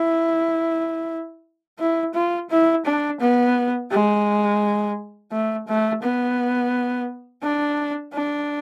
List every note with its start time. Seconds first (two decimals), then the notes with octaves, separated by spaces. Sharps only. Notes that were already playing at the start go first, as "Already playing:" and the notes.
Already playing: E4
1.79 E4
2.14 F4
2.50 E4
2.85 D4
3.21 B3
3.91 G#3
5.31 A3
5.68 A3
6.02 B3
7.43 D4
8.14 D4